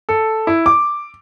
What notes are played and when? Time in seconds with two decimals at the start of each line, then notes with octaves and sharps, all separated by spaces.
0.09 A4
0.47 E4
0.66 D6